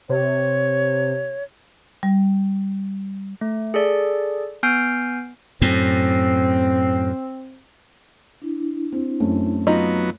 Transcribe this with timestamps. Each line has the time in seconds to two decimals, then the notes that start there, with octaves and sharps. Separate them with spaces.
0.09 C3 C#5
2.03 G3
3.41 A3
3.74 G#4 A4 D5
4.63 B3 G#5 F6 G6 C7 D7
5.62 F#2 A2 C4
8.42 D4 E4
8.92 C4
9.20 F#2 A3 C4
9.67 F#3 B3 D#4 F4 D#5